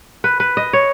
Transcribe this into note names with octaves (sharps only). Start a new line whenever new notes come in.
B4
B4
D#5
C#5